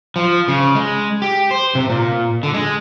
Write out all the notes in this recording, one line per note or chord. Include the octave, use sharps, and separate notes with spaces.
F3
C#3
G#3
G4
C5
C3
A#2
D3
G#3